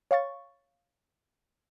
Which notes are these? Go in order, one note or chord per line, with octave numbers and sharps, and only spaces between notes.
C#5 F5 C#6 A6